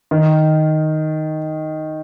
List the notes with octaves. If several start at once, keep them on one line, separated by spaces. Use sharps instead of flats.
D#3